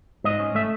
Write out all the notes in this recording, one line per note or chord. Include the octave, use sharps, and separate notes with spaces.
G#2 D#5
C#4
A3 E5